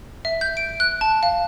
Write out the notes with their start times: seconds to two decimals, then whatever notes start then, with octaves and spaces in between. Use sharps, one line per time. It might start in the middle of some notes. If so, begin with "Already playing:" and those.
0.25 E5
0.41 G6
0.57 D7
0.80 F#6
1.01 A5
1.23 F5